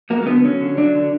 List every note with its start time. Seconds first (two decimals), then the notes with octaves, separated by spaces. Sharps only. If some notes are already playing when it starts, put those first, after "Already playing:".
0.10 F#3 A#3
0.23 A#3
0.27 D3 B3
0.44 F#3 C#4
0.61 D3
0.77 F#3 D4
0.95 D3